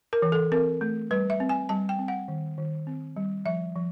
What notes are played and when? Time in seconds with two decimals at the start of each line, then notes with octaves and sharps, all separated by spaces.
0.13 A#4
0.22 E3
0.32 A4
0.52 C4 A#4
0.81 A3
1.11 G3 B4
1.30 E5
1.40 C4
1.49 G#5
1.69 G3 A5
1.89 G5
1.99 C4
2.08 F#5
2.28 D#3
2.58 D#3
2.87 C4
3.16 G3
3.46 F3 E5
3.76 F3